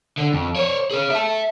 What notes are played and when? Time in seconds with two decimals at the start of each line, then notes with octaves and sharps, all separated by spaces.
0.18 D3
0.33 F2
0.56 C5 C#5
0.91 G#4 C#5
1.10 E5 A5